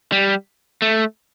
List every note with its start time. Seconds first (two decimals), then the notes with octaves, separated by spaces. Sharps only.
0.12 G3
0.82 A3